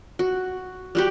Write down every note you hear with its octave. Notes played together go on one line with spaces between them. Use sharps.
F#4
G3 F#4 G4